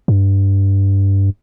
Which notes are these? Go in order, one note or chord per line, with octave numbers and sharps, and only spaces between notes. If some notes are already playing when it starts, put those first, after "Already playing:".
G2